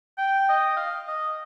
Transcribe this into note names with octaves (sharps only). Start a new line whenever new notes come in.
G5
D#5
F5
D#5